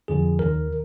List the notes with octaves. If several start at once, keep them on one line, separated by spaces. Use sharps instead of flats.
F2 D3 F3 G#4
D#2 D#3 A#4